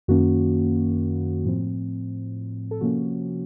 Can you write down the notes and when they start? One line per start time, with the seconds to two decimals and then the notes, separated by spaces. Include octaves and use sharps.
0.08 F#2 D#3 A#3 C#4 F#4
1.45 A2 F3 C4
2.71 A4
2.81 C3 F3 A#3 C#4 F#4